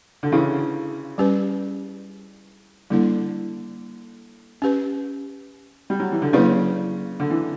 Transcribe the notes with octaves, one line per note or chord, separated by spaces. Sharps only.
D3
C#3 E3
G3 C#4 G4 B4
D3 G3 A#3 E4
C#4 G4 B4
G3
F#3
E3
D3
C#3 F#3 A#3 E4 B4 D5
D3
E3